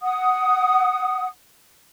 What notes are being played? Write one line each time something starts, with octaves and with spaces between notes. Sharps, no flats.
F#5 D#6